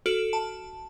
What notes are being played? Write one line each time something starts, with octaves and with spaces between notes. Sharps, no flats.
F#4 A4 F6 D7 E7
A5